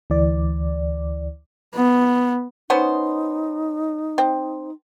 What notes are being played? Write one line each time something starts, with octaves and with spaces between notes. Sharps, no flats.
D2 E3 D5
B3
B3 C#4 D#4 C5
C4